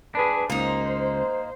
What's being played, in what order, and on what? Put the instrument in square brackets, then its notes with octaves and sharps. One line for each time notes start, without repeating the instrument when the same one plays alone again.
[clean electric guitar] D4 G#4 [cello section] B4
[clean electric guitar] C#2 [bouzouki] A#3 D#4 [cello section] C5